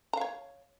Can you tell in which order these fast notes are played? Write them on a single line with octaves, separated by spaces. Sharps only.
A#5 F5 C#5